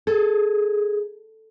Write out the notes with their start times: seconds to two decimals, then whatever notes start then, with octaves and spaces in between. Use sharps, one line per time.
0.07 G#4 A4